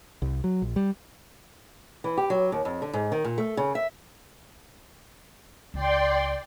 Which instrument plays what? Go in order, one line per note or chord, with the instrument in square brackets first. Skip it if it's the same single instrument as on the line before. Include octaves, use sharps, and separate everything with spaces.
[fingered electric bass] C2
F#3
A#1
G3
[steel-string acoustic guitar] E3
G4
F#3
D#2
F2
D3
G#2
D#3
A#2
A3
C#3
E5
[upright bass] C#2 [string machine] D5 G5 C6